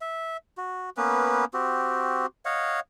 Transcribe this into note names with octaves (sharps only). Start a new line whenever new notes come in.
E5
F#4
A#3 B3 C#4 B4
C4 F#4 G4
C#5 D#5 F5 F#5